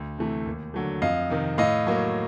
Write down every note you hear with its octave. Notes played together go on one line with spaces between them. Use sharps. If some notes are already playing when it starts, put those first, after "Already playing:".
Already playing: D2
C3 E3 A3
D#2
D3 F#3 A3
F2 D#5 F5
C3 D#3
A2 D#5 F5
F#3 A#3